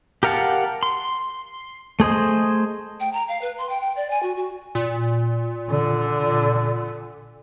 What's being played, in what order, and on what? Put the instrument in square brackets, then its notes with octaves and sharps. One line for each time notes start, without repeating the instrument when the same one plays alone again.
[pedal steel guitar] G4 A#4 F5 F#5 A5
C6
A3 G#4 C5 D#5
[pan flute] G5
A#5
F5
B4
C6
G5
G5
D5
G#5
F#4
F#4
[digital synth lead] A#2
[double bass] D3